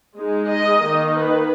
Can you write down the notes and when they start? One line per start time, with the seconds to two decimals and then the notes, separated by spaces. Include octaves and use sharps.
0.16 G#3 D#4
0.49 D#5
0.81 D#3 A#3 D#4
1.14 B4